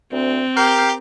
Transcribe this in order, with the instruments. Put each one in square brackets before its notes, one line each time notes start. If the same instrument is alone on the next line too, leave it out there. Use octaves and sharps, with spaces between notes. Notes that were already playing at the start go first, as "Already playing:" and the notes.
[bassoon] D2 [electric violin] C4
[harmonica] G4 [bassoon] A#4 [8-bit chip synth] F6 G6 C7